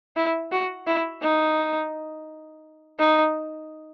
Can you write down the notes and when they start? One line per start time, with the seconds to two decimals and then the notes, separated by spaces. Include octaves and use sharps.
0.16 E4
0.52 F#4
0.87 E4
1.22 D#4
2.99 D#4